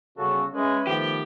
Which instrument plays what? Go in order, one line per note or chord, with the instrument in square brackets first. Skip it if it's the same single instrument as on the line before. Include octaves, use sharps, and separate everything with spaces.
[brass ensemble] G1 C#3 A4 [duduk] F#4
[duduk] G#3 [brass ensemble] C#4 [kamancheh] B4 E5
[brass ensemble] D#3 A3 B3 [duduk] F3 [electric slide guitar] G4